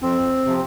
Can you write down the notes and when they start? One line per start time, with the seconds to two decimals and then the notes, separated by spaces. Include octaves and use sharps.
0.02 F2 C4
0.46 C3 F3